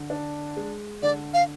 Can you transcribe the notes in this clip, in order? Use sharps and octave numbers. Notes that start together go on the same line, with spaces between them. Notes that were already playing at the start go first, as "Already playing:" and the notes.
Already playing: D3
D4
G#3
D3 D5
F5